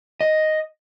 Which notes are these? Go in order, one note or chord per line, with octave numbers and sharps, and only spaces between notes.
D#5